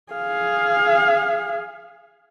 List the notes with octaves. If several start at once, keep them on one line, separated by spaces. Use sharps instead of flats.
G#4 F5